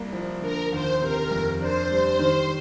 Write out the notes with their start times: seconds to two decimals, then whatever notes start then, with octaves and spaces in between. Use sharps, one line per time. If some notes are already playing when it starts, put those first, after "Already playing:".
Already playing: C2 A#3
0.13 F3
0.42 D3 A#4
0.72 D#2 C5
1.02 C3 A#4
1.31 F2
1.61 D4 C5
1.91 G3
2.19 D#3